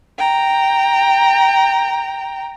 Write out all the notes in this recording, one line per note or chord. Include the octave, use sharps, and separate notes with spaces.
G5 A#5